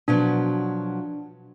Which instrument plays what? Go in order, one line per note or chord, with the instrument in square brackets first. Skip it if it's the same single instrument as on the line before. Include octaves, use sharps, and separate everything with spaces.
[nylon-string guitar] B2 F3 F#3 [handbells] D4